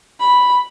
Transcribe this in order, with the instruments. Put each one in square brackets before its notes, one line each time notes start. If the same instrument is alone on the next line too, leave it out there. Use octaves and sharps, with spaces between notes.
[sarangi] B5